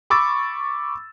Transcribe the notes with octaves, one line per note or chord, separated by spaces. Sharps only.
B5 C#6 D6 E6 A6